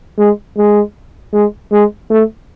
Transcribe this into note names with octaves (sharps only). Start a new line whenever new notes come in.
G#3
G#3
G#3
G#3
A3